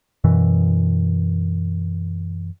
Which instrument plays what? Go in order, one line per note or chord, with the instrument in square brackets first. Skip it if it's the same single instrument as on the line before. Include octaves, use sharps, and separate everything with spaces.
[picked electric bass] F#2 B2 E3